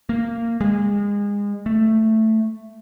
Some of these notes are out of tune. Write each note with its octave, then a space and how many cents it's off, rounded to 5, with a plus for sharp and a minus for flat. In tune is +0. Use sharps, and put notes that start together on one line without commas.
A#3 -15
G#3 -30
A3 +5